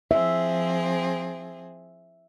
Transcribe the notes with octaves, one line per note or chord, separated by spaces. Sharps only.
F3 C4 G#4 E5